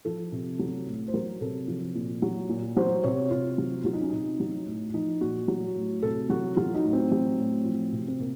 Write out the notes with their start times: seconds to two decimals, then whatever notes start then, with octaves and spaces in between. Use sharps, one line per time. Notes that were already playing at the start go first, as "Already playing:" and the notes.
0.05 F3 A4
0.32 C3
0.59 F#3
0.87 A2
1.08 C5
1.13 F#3 A#4
1.41 C3 A4
1.68 F3
1.95 A#2
2.22 F#3
2.49 A#2
2.76 F#3 C5
3.04 C3 C#5
3.30 C3 F4
3.58 F#3
3.85 F#3 F4
3.93 D#4
4.01 C#4
4.10 C3 D#4
4.40 F#3
4.66 A2
4.94 F3 D#4
5.21 A#2 F#4
5.48 F#3
5.76 A2
6.02 C3 A4
6.29 F#3 F#4
6.56 F#3 F4
6.74 D#4
6.84 A2
6.93 C4
7.11 F#3
7.38 A2
7.65 F3
7.92 C3
8.08 C4
8.19 C3 A#3